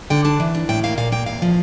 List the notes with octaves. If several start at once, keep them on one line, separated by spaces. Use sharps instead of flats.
D3 G5
D4 A5
E3
D4
A2 G5
A#3 F5
A#2 F5
A#3 G5
E2 F5
F3